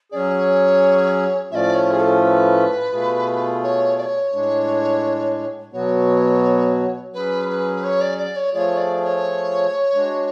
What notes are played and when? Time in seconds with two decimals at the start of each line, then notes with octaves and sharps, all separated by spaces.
0.12 F#3 C#4 G#4 C#5 D5
1.52 A2 F3 A3 C#4 F4 D5 E5
1.75 C#5
1.91 G#4
1.99 A4
2.22 B4
2.92 B2 A3 F4 G#4
3.63 C#5
3.98 D5
4.02 C#5
4.33 A2 G#3 D4
5.72 B2 F#3 B3 F#4 C#5
7.13 F#3 C#4 G#4 B4
7.49 B4
7.76 B4
7.83 C#5
8.01 D5
8.18 D5
8.36 C#5
8.53 F3 A3 F4 G#4 C#5 D5
8.77 D5
9.01 D5
9.04 C#5
9.94 G#3 D4 F#4